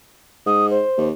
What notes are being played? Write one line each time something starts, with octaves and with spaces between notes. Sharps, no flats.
G#2 D#6
C5
D#2